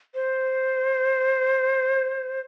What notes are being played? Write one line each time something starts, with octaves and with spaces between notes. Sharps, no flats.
C5